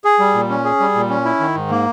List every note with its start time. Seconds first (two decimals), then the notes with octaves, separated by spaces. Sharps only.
0.04 G#4
0.19 G3
0.34 A#2
0.49 C#4
0.65 G#4
0.80 G3
0.95 A#2
1.10 C#4
1.25 E4
1.40 D#3
1.55 G#2
1.70 A#3